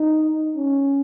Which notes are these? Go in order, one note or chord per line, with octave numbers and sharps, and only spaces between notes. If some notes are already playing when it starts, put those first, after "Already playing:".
Already playing: D#4
C#4